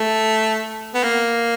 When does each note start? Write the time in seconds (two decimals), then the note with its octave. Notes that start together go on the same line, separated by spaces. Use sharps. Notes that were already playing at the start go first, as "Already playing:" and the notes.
Already playing: A3
0.94 B3
1.03 A#3